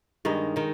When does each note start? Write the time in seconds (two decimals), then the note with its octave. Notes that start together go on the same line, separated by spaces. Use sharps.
0.25 G2 D#3 G#3 D#4
0.56 D#3 G#3 D#4